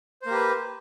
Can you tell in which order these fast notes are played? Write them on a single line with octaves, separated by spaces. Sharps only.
C5 A#3 G4 B4